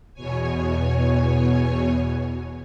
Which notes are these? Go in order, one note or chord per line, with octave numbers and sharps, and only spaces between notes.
E2 B2 C#5 G#5